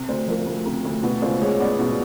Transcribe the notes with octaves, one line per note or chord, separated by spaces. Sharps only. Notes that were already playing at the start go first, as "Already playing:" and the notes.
Already playing: C3
D2 C5
F3 A#4
D2
C3
D2
B2 B4
C#2 C5
G#3 C#5
B3 D5
B2